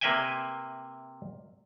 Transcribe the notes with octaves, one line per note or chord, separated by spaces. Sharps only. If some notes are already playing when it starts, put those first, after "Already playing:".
C3 A#3 B4 E5 G5 G#5